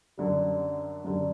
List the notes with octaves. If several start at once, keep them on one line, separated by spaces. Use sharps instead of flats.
F#2 D3 G3
F#2 D3 G3